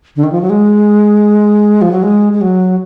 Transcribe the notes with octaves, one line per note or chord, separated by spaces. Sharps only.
D3
D#3
F3
F#3
G#3
F3
F#3
G#3
G#3
F#3